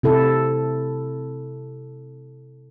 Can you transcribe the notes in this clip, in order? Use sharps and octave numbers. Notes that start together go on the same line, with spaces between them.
C3 E4 A4